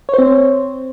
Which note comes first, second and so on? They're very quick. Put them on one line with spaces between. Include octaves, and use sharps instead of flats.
C#5 C5 C4